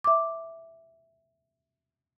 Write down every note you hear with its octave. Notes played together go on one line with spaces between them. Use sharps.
E5 D6